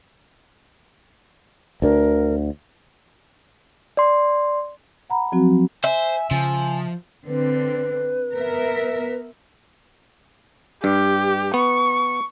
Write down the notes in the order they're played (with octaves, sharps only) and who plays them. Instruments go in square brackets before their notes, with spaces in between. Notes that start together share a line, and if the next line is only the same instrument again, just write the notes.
[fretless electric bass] D2 D3 [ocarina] A#4
[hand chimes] D5 C6
[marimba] F#5 A#5 B5
F3 F#3 C4 F#4
[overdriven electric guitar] C5 [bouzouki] E5 [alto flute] G#5
[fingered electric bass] C#3 [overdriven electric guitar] F3 [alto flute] G#5
[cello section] D3 C4 [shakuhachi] B4
[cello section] B3 A#4 E5
[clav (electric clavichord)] G2 [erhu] G4
[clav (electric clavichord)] B3 [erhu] C#6